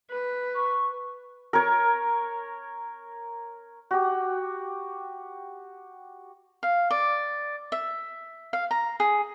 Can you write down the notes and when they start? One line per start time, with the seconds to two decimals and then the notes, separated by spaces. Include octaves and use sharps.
0.10 B4
0.55 C#6
1.53 A#4 C#5
3.91 F#4 G4
6.63 F5
6.91 D5
7.72 E5
8.53 F5
8.71 A#5
9.00 G#4